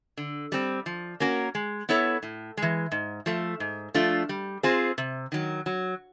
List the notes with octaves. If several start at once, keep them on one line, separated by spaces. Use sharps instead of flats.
D3
G3 C4
F3
A#3 C#4 F#4 A#4
G#3
B3 E4 A4 C#5
A2
E3 G#3
G#2
F3 A3
G#2
F3 A3 D4 F4
G3
C4 F4 G#4 C5
C3
D#3 F#3
F#3